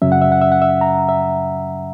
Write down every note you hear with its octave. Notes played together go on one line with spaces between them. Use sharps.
F#2 C#3 F#3 C#4 E5
F#5
E5
F#5
E5
F#5
E5
A#5
E5